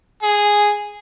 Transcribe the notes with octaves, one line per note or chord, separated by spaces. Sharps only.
G#4